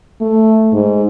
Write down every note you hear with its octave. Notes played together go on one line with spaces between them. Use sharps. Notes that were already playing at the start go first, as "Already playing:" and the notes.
A3
G#2